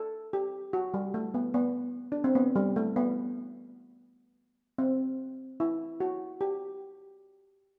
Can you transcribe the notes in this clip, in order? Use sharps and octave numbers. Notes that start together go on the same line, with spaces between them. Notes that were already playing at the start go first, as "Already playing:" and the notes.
Already playing: A4
G4
F#4
G3
A3
B3
B3
D4
C4
B3
G3
A3
B3
C4
E4
F#4
G4